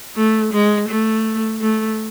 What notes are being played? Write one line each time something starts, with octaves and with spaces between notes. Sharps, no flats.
A3
G#3
A3
A3